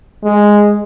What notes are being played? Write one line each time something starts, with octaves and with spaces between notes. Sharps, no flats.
G#3